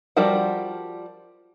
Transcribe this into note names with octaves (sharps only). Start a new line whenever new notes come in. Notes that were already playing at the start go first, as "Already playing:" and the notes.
F3 G3 F#4 A#4 F#5